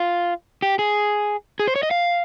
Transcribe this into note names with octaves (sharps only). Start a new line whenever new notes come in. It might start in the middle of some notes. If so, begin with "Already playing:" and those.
Already playing: F4
G4
G#4
G#4
C5
C#5
D#5
F5